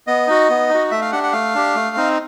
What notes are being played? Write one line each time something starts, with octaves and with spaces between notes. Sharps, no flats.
B3 D#5
D#4 F#4
B3
D#4 F#4
A3 E5
F5
D4 G4 F#5
F#5
A3 F5
D4 G4
A3
C4 D#4